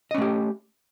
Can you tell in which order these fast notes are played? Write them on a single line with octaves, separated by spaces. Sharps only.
D#5 C#4 A3 G4